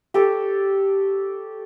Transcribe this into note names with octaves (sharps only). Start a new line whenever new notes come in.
G4 A4 C#5